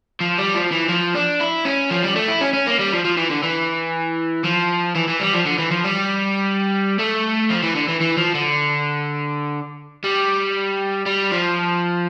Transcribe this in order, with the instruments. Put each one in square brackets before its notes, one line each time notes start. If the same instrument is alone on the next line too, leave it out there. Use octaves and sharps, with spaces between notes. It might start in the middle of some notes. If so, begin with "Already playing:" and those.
[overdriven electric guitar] F3
G3
F3
E3
F3
D4
E4
C#4
F3
G3
A3
E4
C#4
C#4
A#3
G3
F3
F3
E3
D3
E3
F3
E3
E3
G3
F3
D3
E3
F3
G3
A3
F3
E3
D3
E3
E3
F3
D3
G3
G3
F3